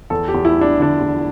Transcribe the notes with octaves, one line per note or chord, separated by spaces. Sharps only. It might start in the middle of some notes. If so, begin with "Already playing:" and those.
E2 A4
G4
E2
E4
G3
D4
D3 D4
E2